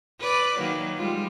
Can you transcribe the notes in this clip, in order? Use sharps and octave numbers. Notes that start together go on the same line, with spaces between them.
B4 D5
D#3 F#3 A#3
G3 G#3 F4